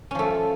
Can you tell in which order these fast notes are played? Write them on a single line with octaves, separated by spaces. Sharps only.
C#4 F3 A3